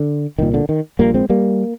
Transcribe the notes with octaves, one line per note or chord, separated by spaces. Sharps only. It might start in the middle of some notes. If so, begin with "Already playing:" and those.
Already playing: D3
C2 A#2 D#3
D3
D#3
A#1 A#2 G3 A#3
G#3 C4
G3 A#3